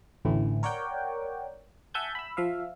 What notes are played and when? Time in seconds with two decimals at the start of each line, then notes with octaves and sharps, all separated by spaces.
0.25 A1 D2 A2 E3
0.63 A#4 C#5 D5 F#5 G5
1.94 E5 F#5 G#5 A5 G6 G#6
2.15 B5 E6
2.37 F3 E5 F5